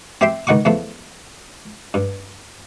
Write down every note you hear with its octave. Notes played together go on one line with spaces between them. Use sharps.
C4 G4 E5 G5 C6
C#2 D#3 F#5 C#6 D6
E2 F3 A3
G2